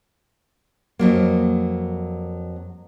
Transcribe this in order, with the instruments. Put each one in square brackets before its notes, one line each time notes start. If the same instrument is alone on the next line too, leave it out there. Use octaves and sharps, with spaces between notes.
[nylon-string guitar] F2 F#3 A#3